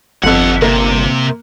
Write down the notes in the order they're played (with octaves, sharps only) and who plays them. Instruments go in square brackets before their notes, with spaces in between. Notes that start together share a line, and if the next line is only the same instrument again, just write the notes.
[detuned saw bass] G1 [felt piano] F2 F#6 [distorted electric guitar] E4 F#5
[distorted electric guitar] C3 [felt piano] A#3